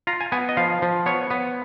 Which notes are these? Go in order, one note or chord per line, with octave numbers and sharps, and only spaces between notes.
F4 A#5
G#5
B3 G#5
D#5
F3 F5
F3
B3 C#5
B3